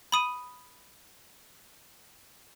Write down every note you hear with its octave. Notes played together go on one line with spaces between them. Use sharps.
B5 D#6 D#7